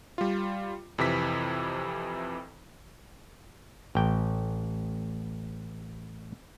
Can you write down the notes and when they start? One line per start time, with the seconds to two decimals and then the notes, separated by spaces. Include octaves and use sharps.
0.18 G3 F4
0.98 F2 C3 E3 B6
3.95 A1 G5